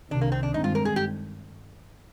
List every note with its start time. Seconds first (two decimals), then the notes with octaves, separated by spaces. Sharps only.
0.10 C2 C3 D#3 D4
0.21 A#3
0.32 C4
0.43 D4
0.54 G2 D#3 G#3 C4 D#4
0.64 F4
0.75 A#4
0.85 G#4
0.96 G4